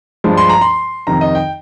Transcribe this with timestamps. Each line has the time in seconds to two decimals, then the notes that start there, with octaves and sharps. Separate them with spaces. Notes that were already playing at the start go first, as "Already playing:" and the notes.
0.24 G2 F3 G#3 D4
0.37 C6
0.49 A#5
0.61 C6
1.07 F2 C3 D#3 A#5
1.21 D#5
1.35 G5